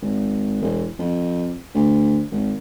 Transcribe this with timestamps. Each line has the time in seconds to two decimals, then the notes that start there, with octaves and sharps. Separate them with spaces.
0.02 G#1
0.62 E1
0.99 F2
1.75 D2
2.31 G#1